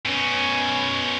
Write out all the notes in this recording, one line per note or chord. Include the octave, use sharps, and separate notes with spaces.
B2 C#4